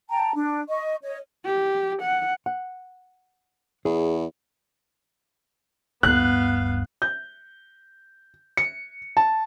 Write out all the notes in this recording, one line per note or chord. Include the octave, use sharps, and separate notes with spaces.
G5 A5 A#5
D4
D#5 C#6
C#5 D#5
G4
F#5
F#5
E2 G#4
D1 G2 B3 F5 F#6
G6
C#7
A5